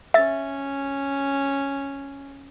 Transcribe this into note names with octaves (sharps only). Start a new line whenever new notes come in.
C#4 E5 A6